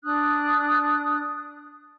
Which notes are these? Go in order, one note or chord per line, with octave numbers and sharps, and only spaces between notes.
D4 D#6 F#6